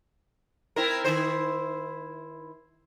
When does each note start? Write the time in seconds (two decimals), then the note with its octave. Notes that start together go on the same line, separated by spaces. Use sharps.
0.76 C4 E4 A#4
1.04 D#3 E4 C5